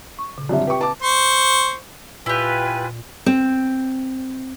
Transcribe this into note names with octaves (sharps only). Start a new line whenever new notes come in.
C#6
A#2 C#3
F#2 D3 G3 C4 E5
G4 B4 G5 C#6
B4 A5 D6
C5 C#6
A#2 E4 F4 G4 B4 G#5
C4